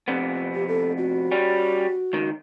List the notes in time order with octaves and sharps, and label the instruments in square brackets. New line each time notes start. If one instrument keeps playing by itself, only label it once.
[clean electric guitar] F2 C3 B3
[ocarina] G4
A4
F#4
[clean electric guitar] G3 C#4
C#2 D#3